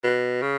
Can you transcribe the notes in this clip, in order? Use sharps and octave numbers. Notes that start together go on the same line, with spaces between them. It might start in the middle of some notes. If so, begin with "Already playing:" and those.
B2
C#3